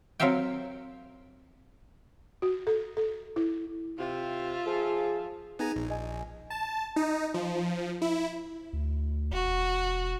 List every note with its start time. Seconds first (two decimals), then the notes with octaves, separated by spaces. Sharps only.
0.20 F#3 C4 A#4 E5 F5 G5
2.42 F#4
2.67 A4
2.97 A4
3.36 E4
3.99 C3 F4 E5
4.66 F3 G#4
5.59 B3 D#4 G#4 G#5 A#5
5.76 A#1
5.90 D#5 G#5
6.50 A5
6.96 D#4
7.34 F3
8.02 E4
8.73 D2
9.32 E1 F#4